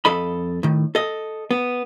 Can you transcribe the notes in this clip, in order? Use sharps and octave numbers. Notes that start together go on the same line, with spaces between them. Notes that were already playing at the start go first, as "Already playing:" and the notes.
F2 A4 D#5 B5
A2 D#3
A4 D#5
B3